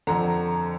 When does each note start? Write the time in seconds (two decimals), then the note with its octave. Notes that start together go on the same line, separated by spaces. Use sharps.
0.07 F2 D3 A#5